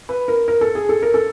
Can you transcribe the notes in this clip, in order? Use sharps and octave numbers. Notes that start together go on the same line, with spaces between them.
B4
A#4
A#4
A4
G#4
A4
A#4
A4